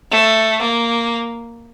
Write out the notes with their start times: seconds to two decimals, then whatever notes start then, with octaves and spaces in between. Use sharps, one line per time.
0.11 A3
0.62 A#3